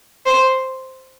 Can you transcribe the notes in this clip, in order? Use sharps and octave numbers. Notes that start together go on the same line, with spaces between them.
C5